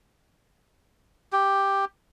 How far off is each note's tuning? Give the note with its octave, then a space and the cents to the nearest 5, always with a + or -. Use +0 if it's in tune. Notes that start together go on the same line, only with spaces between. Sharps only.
G4 +5